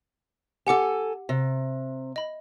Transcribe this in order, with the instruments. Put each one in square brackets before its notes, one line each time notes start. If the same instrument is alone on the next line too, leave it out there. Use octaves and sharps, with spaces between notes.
[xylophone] G4 F#5 D6 [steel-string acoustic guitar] A4 G#5
[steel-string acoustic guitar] C3
[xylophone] D#5 B5